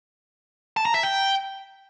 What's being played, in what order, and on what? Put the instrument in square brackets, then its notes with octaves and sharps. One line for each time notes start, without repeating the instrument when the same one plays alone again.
[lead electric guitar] A5
A#5
E5
G5